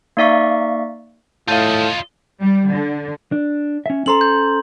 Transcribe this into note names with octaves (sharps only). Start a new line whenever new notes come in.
A#3 D#4 D5 E5 F5 C#6
A2 F4 A4 D#5 F5 G6
G3
D3
D4
C#4 E5
C#4 A4 C5 A#5 C6 F#7
G6